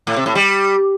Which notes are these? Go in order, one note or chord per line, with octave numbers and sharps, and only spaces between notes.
A2
C3
A2
G3